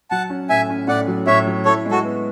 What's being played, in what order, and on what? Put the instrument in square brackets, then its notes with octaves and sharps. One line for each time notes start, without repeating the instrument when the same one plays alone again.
[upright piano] F#3 [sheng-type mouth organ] F#5 A5
[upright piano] C#4
[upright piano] A2 [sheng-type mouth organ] E5 G#5
[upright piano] C#4
[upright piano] A2 [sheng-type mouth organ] D5 F#5
[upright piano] F#3
[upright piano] A2 [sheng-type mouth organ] C#5 E5
[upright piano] F#3
[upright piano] E4 [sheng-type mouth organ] A4 C#5
[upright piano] G#3
[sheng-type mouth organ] F#4 A4
[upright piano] B3